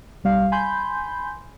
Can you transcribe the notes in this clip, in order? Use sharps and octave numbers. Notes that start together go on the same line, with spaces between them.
B1 G3 F5
G#5 B5 C6 G6